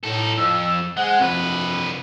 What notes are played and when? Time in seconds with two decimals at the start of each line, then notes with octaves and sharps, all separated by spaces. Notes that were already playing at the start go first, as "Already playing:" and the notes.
0.03 A2 D#4 A4
0.38 F2 E6
0.97 G#3 G#4 C5 F#5
1.20 C2 F2 F3 C4 B4